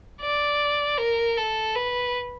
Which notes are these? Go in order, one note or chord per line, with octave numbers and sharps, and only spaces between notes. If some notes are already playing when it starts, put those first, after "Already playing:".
D5
A#4
A4
B4